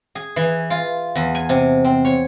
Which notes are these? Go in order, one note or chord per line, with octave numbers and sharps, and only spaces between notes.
G#4
E3
F4
E2
G#5
C3
C4
C#5